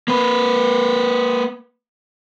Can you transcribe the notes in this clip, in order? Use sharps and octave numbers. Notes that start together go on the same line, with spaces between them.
A#3 B4